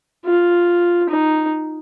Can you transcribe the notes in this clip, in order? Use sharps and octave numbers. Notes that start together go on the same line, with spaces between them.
F4
D#4